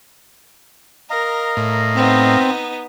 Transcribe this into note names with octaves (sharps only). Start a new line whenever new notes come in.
A#4 D#5 F5 A#5
A2
B3 C4 D#4